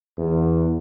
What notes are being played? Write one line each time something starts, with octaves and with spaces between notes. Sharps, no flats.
E2